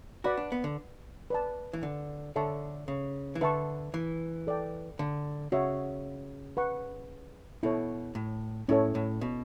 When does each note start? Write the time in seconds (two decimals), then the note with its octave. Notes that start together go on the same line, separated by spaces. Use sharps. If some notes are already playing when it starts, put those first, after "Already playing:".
0.24 F#4 B4 D5 F#5 B5
0.37 D4
0.52 B3
0.64 D3
1.30 B4 D5 A5
1.73 E3
1.83 D3
2.36 D3 A4 C#5 E5 A5 C#6
2.88 C#3
3.35 E3
3.41 D3 B4 E5 A5 C#6
3.94 E3
4.47 A4 D5 G5
4.99 D3
5.52 C#3 F#4 C#5 E5
6.57 B4 F#5 C#6
7.63 B2 E4 A4 C#5
8.15 A2
8.68 A2 C#4 E4 A4 C#5
8.95 A2
9.21 B2